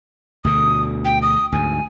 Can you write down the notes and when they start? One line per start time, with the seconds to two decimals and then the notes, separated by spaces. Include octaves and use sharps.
0.45 D2 B2 D3 D#6
1.05 G5
1.22 D#6
1.52 D2 G#2 G#5